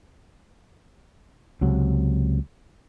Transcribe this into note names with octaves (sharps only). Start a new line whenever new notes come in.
C#2 C3 F#3